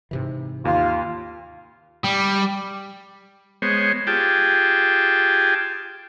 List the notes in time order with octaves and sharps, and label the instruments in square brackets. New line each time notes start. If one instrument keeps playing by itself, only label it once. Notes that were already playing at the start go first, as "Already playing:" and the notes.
[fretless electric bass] G#2 C3 E3
[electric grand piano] D#2 [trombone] F4 [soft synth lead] F5
[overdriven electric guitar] G3
[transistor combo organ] G#3 B3 C5 C#5
F4 G4 G#4 G5 A5